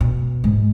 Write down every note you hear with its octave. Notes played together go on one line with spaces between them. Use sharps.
B2
G#2